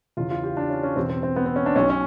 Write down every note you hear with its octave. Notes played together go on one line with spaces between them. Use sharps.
E2 C#3 E3 F4
F4
G4
D4
C#4
C#4
E2 B2 C4
C4
C4
B3
C4
C#4
D4
B1 B2 C#4
C#4